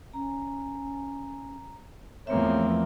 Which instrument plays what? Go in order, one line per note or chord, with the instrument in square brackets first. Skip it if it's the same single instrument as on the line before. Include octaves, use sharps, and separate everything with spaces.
[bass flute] C#4 [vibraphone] A#5
[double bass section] E2 F3 [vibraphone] A3 E5 [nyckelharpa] A#3 C4 [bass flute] C#5